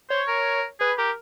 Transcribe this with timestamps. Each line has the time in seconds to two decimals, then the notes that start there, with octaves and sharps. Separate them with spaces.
0.10 C5 C#5
0.27 A#4
0.80 G#4 B4
0.98 G4 A#4